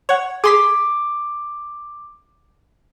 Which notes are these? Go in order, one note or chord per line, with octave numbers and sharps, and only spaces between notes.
C#5 F#5
G#4 C6 D6 B6